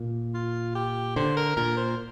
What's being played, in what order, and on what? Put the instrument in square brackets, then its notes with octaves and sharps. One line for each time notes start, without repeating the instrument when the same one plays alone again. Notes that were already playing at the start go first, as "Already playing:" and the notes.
Already playing: [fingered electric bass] A#2
[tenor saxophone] F4
G4
[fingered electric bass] D3 [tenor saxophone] C5
[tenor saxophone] A#4
[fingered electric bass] A#2 [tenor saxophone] A#4
[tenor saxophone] C5